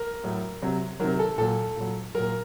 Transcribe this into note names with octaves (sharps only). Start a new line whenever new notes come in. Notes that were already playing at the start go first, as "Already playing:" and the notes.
Already playing: A#4
A2 F#3
C3 F#3
C3 D#3 F#3 A#4
A4
A#2 F#3 A4
A#2 F#3
A#2 F#3 A#4